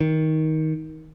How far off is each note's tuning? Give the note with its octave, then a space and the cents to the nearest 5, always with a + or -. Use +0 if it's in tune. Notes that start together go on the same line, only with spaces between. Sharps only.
D#3 +15